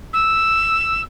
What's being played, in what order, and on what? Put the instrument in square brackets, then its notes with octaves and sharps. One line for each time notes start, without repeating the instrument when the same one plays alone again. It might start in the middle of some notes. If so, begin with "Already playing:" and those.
[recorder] E6